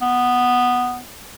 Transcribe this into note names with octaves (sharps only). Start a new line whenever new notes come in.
B3